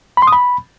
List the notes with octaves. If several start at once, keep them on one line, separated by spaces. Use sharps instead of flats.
B5
C6
D#6
B5